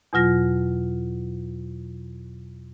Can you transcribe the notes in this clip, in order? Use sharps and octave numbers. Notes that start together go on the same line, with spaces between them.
E2 B2 F#3 F4 A#6